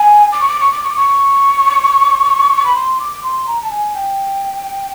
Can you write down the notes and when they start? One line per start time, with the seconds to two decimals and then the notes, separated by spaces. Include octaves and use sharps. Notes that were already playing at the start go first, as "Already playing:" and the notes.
Already playing: G#5
0.32 D6
0.40 C#6
0.48 D6
0.60 C#6
0.72 D6
0.83 C#6
0.89 D6
0.95 C#6
2.65 B5
2.75 C6
2.99 D6
3.22 C6
3.46 A#5
3.61 A5
3.70 G#5
3.94 G5